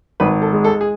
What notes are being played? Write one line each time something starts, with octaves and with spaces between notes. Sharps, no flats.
G#1 B4
A4
G#3
A4
G#4